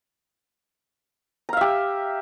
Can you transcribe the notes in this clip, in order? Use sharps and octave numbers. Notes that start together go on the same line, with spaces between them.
G4 E5 F5 A#5